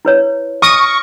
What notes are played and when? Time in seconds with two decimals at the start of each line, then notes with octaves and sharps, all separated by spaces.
0.05 E4 B4 C#5
0.62 C#6 D#6 F6 A#6 D7